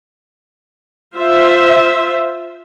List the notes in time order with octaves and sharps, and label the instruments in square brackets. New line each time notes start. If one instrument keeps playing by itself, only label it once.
[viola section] F4 C5 E5